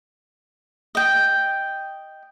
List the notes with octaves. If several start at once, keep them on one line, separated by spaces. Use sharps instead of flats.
D#5 G5